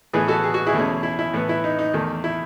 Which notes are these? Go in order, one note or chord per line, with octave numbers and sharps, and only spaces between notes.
A2 E3 B3 G#4 B4
F#4 A4
G#4
F#4
E4 G#4
E2 B2 A3 C#4
E4
E4
A2 E3 B3
E4
D#4
D#4
E2 D#3 A3
E4